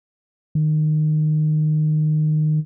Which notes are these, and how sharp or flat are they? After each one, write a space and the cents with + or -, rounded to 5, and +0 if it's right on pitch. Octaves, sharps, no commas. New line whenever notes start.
D#3 -20